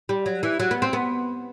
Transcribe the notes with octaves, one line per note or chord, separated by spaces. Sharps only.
G3
F#3
E3
F#3
B3
C4
B3